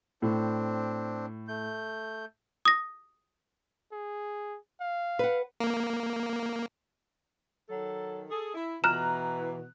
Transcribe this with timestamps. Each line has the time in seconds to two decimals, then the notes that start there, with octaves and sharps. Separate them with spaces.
0.22 A2 C4 D4
1.48 A3 G6
2.65 D#6 A#6
3.93 G#4
4.81 F5
5.19 B4 F#5
5.60 A#3
7.70 D#3 F#3 A4
8.30 G#4 A4
8.55 E4
8.84 B2 E3 A#5 F6 F#6 E7